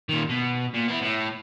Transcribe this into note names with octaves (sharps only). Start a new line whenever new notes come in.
A#2 D#3
B2
A#2
B3 E4
A2